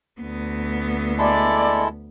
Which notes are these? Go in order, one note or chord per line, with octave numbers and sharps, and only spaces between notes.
D2 B3
G#3 E4 A4 D5